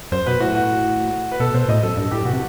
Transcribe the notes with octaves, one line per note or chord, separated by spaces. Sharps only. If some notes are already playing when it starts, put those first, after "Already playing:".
F#2 C5
B2 B4
A2 F#4
F#4
B4
B2 A4
B2 C5
A2 D#5
F#2 A4
G2 A4
A2 G4
B2 F#4
C3